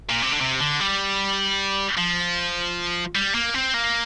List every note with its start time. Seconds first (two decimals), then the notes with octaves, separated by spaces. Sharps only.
0.10 A#2
0.22 C3
0.32 D3
0.41 C3
0.60 D3
0.80 G3
1.97 F3
3.15 G3
3.35 A#3
3.54 C4
3.74 A#3